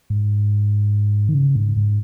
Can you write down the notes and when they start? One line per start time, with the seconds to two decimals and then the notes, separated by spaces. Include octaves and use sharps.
0.10 G#2
1.29 D#3
1.34 C#3
1.55 G#2
1.76 G#2